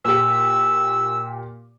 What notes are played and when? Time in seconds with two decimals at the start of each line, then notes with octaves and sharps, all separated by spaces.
0.05 A#2 G4 E6